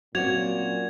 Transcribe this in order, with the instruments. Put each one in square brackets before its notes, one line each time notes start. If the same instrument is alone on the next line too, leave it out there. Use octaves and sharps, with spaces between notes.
[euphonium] A#2 [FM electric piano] F#3 C4 C#4 [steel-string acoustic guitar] F#4 D5 [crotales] G#6 F7